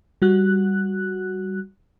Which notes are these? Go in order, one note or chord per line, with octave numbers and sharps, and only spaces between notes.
G3 F#4 F#6